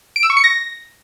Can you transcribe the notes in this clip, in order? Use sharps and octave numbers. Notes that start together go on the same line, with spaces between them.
D7
E6
C#6
C#7
A#6